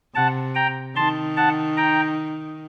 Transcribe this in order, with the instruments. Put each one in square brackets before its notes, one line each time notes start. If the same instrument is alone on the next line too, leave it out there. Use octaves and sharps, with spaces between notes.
[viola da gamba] C3 [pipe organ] F#5 A5
[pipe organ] G5 A#5
[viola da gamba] D#3 [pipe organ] A5 C6
[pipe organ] F#5 A5
G5 A#5